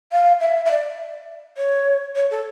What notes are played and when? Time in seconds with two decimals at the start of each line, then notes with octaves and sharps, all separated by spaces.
0.12 F5
0.41 E5
0.65 E5
0.71 D5
1.58 C#5
2.16 C#5
2.31 A4